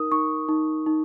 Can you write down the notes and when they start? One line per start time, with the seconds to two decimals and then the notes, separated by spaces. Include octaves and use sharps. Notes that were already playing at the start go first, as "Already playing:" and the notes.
Already playing: D#4 A#4 D#6
0.12 D#4 C#6
0.49 D#4
0.86 D#4